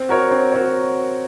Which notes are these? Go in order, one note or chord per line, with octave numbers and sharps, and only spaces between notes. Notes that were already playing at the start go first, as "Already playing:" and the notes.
Already playing: C4
F#4 A#4 C#5
C4
F#4 A#4 C#5